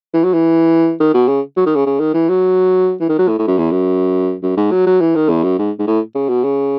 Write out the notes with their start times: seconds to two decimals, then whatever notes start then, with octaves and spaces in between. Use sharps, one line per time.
0.14 E3
0.24 F#3
0.33 E3
1.00 D#3
1.14 B2
1.28 C#3
1.57 F#3
1.66 D#3
1.76 C#3
1.86 C#3
2.00 D#3
2.14 E3
2.29 F#3
3.01 E3
3.09 D#3
3.19 F#3
3.28 A2
3.39 A2
3.47 F#2
3.58 E2
3.71 F#2
4.43 F#2
4.57 G#2
4.71 F#3
4.86 F#3
5.01 E3
5.15 D#3
5.29 E2
5.43 F#2
5.58 G#2
5.79 G#2
5.87 A2
6.15 C#3
6.29 B2
6.44 C#3